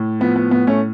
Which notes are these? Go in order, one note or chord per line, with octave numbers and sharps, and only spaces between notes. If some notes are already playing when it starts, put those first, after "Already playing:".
Already playing: A2
F3 B3
B3
A2 B3
A3 C#4